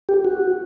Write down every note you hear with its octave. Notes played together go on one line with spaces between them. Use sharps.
G4
F#4